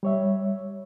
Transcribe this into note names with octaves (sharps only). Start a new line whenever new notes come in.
G3 C#5 E5